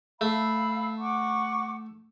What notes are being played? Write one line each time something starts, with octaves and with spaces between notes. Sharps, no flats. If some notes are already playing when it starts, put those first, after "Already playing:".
A3 F5 B5 E6
F#5 C#6 D6